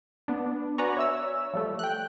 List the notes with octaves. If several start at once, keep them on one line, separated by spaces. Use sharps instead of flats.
B3 D4
F#4 B4 D5 G#5 A#5 C#6
C#5 E5 E6
F3 G3 A3
G5 F#6